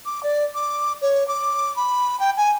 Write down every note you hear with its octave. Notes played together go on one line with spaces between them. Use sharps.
D6
D5
D6
C#5
D6
B5
G5
G#5